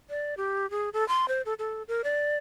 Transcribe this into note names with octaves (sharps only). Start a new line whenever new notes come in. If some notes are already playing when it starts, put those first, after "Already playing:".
D5
G4
G#4
A4
C6
C5
A4
A4
A#4
D5